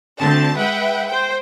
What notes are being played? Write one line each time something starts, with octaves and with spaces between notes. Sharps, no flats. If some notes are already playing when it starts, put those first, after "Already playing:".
D2 D3 C4 A5
G#3 B4 E5 F#5 G5
C5 G5